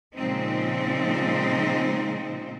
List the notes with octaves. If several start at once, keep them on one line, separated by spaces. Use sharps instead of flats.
A#2 C#3 F3 G#3 C4 D#4